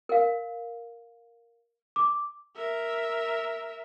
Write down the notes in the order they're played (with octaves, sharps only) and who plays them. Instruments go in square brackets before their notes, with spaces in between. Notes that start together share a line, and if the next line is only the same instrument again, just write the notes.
[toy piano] A#4 F5
[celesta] D6
[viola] A#4 E5